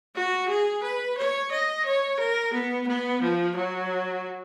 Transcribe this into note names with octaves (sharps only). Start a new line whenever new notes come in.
F#4
G#4
B4
C#5
D#5
C#5
A#4
B3
B3
F3
F#3